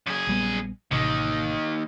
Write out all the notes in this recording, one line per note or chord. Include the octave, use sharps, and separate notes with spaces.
F#2 G#4
A#1 G3 B3
A1 D#2 C3 D#3